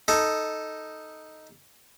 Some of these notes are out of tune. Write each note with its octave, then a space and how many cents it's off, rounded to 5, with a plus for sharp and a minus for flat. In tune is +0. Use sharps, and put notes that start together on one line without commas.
D#4 +0 A4 +0